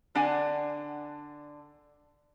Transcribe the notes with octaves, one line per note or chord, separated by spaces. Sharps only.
D3 D4 F#5 G#5